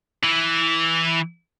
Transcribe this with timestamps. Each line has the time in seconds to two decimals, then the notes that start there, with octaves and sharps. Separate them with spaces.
0.24 E3